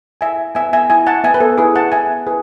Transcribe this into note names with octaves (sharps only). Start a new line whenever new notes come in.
E4 E5 G#5
B3 E5 G#5
E5 G#5
E4 E5 G#5
F#5 A5
B3 E5 G#5
B4
A4
E4 G#4 B4
F#5 A5
B3 E5 G#5
E4 G#4 B4